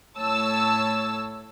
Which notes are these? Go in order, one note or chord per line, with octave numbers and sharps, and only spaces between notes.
A2 C#5 A5 E6